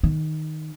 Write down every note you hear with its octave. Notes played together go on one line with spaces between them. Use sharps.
D#3